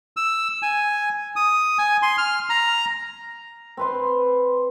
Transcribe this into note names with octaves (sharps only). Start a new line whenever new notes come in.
E6
G#5
D#6
G#5
C6
F6
A#5
C4 B4 C6